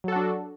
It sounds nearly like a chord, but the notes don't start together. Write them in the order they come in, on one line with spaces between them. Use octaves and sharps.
F#3 A4 F#4 D4